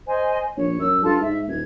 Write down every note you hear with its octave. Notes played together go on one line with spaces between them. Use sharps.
C5 D#5 G#5
A#1 C#5
F#2 E6
G2 F4 A4 A5
G#2 E5
D#1 G#6